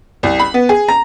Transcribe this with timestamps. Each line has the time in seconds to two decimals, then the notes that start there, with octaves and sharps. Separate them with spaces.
0.23 C2
0.39 B5
0.54 B3
0.69 G#4
0.88 A#5